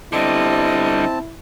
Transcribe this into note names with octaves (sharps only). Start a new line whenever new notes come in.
D3 G3 C4 E4 D#5 A5